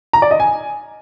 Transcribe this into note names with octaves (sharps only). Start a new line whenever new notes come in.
A#5
D5
D#5
G#5